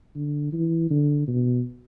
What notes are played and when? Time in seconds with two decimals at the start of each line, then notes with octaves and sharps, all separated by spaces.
0.15 D3
0.53 E3
0.90 D3
1.27 B2